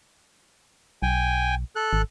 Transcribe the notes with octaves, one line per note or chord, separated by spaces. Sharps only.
B1 G5 G#5
A4 F#6
G#1